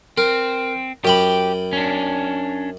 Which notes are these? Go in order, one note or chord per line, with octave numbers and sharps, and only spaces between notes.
C4 A#4
F#2 G4 G5 B5
C#4 D4